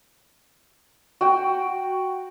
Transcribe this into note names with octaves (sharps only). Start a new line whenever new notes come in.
F#4 G5